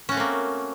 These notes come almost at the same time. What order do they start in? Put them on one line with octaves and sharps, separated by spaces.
C#4 F#4 A3 C4 A#3